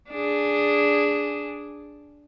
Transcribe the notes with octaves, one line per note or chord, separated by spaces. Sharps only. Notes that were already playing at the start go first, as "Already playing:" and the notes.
D4 G#4